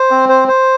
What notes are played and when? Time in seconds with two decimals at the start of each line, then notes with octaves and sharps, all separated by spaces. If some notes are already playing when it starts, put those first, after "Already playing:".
Already playing: C5
0.11 C4
0.29 C5
0.48 C5